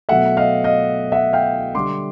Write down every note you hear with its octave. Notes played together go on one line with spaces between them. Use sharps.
B2 F#3 A3 E5 F#5
D#5 F5
D#5 F5
E5 F#5
F5 G5
D3 G3 C6 D6